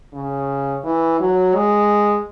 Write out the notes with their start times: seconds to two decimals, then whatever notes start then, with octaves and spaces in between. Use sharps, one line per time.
0.14 C#3
0.84 E3
1.20 F#3
1.55 G#3